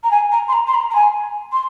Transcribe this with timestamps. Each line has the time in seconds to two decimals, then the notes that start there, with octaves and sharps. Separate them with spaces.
0.03 A#5
0.11 G#5
0.32 A#5
0.47 C6
0.52 A#5
0.67 C6
0.74 A#5
0.90 A#5
0.95 G#5
1.52 C6